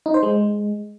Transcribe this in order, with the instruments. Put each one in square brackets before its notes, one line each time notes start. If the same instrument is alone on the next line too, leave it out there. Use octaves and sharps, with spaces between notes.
[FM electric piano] D#4
C5
G#3